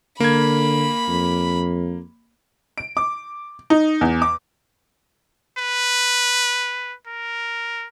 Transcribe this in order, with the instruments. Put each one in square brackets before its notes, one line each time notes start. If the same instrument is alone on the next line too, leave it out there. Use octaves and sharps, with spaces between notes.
[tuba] D3 [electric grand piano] A#3 G#6 [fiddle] B5
[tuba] F2
[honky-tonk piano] D7
D6
D#4
E2
D6
[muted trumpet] B4
A#4